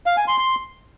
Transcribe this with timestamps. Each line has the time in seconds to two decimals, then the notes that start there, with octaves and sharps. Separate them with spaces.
0.06 F5
0.17 G#5
0.28 C6
0.38 C6